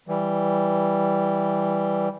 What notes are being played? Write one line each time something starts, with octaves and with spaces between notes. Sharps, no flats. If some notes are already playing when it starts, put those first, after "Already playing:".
E3 G3